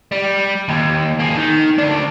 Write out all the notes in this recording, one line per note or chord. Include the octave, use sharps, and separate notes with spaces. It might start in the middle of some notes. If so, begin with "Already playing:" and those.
G3
D#2
A#3 G#4
D#3
D2 D4